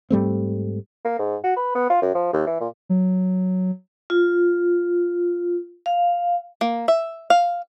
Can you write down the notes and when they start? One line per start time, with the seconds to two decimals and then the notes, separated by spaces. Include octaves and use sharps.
0.10 G#2 G3 A3 C4
1.05 A#3
1.19 G#2
1.44 F#4
1.56 B4
1.75 B3
1.90 F4
2.02 F#2
2.15 F3
2.33 D#2
2.47 E3
2.61 A#2
2.89 F#3
4.10 F4
5.86 F5
6.61 A#3
6.88 E5
7.30 F5